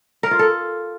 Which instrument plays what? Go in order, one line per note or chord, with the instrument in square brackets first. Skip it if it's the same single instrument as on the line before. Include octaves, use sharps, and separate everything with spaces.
[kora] A#4
F4
A4